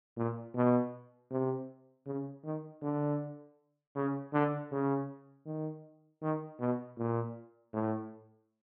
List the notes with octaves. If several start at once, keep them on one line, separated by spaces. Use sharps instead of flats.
A#2
B2
C3
C#3
D#3
D3
C#3
D3
C#3
D#3
D#3
B2
A#2
A2